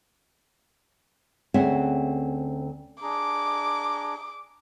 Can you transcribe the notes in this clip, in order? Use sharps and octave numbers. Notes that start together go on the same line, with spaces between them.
D2 C4 C#4 G#4 E5 F#5
D4 G#4 A#5 D6